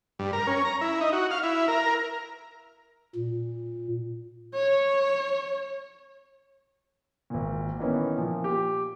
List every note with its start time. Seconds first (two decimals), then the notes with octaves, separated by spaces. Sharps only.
0.19 G2
0.33 A#4
0.47 C#4
0.65 A#5
0.81 E4
1.01 D#4
1.13 F#4
1.31 F5
1.43 E4
1.68 A#4
3.16 A#2
4.54 C#5
7.30 G#1 A#2
7.79 D#3 E3 B3 C#4
8.17 A#2 F3
8.44 G4